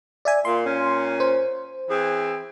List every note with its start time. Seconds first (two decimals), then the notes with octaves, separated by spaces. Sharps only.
0.25 D5 E5 G#5
0.45 A#2 C6
0.65 A#2 C#4
1.20 C5
1.90 E3 C4 G#4